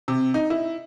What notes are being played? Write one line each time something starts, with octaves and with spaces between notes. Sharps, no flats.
C3
D#4
E4